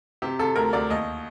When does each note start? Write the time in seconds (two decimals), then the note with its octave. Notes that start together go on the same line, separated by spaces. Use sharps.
0.22 C3 G4
0.39 C3 A4
0.56 D2 A#4
0.73 D2 D5
0.90 D#2 D#5